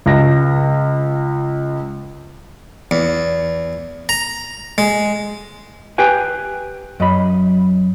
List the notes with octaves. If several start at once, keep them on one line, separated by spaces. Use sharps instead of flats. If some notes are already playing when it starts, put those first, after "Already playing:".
C#2 A#6
E2
A#5
G#3
G4 B4 G5 G#5
F#2 D#5 B5